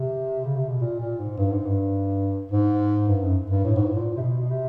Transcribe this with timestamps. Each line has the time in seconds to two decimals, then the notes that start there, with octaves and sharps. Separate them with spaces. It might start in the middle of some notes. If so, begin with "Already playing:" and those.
Already playing: C3
0.44 C#3
0.56 C3
0.68 B2
0.80 A#2
1.00 A#2
1.19 G#2
1.38 G2
1.52 G#2
1.65 G2
2.51 G#2
3.08 G2
3.22 F#2
3.50 G2
3.64 A2
3.76 G#2
3.85 A2
3.94 A#2
4.17 C3
4.21 B2
4.40 B2
4.51 C3